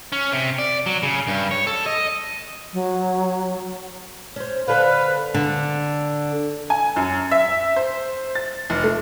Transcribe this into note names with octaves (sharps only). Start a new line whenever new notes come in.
C#4
C3
D5
F#3
C#3
G2
C#5
A4
D#5
F#3
C#4 C5
D3 A4 B4 C5 F5
D3
G#5
F#2
E5
C5
A6
F1
A3